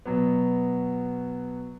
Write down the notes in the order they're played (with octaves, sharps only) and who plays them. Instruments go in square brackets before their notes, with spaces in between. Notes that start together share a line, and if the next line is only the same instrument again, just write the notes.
[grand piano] B2 F#3 B3